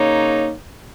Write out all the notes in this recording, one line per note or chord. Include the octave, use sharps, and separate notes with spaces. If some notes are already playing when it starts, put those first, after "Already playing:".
Already playing: C#3 A#3 D#4 C#5